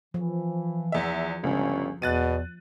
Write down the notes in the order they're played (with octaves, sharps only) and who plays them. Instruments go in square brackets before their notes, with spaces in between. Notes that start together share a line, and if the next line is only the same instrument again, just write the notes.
[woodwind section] E3 [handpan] F3
[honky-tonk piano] E2 E5
[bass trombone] G1 [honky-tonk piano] C#2 [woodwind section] C#4
[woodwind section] E2 [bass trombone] B2 [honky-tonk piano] F#6 A6 D#7